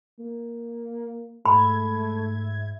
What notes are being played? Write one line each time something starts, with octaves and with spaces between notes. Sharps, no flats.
A#3
G#2 A3 E5 B5 G#6